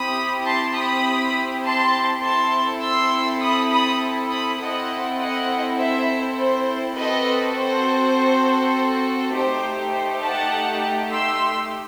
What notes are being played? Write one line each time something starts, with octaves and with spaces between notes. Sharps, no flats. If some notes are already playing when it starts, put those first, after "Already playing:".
Already playing: C4 E4 G4 B5 D#6
A5 C6
B5 D#6
A5 C6
C4 E4 A4 A5 C6
C6 E6
B5 D#6
B5 D#6
B5 D#6
C4 E4 A4 D#5 F#5
D#5 F#5
C5 E5
C5
C4 F#4 A4 B4 D#5
C5
A3 D#4 G4 C5
C5
F#5 A5
C6 E6